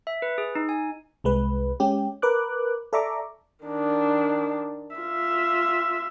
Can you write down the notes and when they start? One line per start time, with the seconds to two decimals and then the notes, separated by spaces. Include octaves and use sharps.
0.07 E5
0.22 B4
0.38 G#4
0.55 D#4
0.69 G#5
1.24 C2 G#3 B4
1.80 G#3 C#4 G4
2.22 A#4 B4 D6 F#6
2.93 A4 D5 E5 A#5 C#6 D6
3.65 D#3 D4
4.96 F4 E5